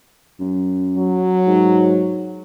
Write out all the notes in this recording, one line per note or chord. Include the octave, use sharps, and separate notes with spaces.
F#2
F#3
G#2